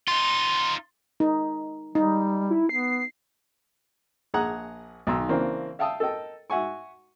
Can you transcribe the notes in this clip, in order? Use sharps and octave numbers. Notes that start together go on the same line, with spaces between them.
D#4 F4 C6
D#4
G3 D#4
E4
B3 C7
A#1 G#4 F#5 A#5 F#6
B1 D#3 A#5 C6 E6
C#3 E3 A#3 C4 D4
E5 F5 G5 A5 D#6 E6
A4 A#4 D#5 G5
F#4 E5 F#5 G#5 C#6